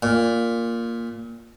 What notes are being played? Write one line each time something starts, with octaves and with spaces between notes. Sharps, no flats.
A#2